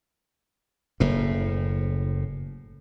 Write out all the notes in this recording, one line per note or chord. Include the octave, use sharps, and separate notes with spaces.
F#1 A2